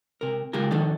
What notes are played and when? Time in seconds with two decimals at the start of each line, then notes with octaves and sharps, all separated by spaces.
0.21 C3 A#4
0.53 C#3 G#3 F4 G4 A#4
0.71 D#3 F3 D4 A4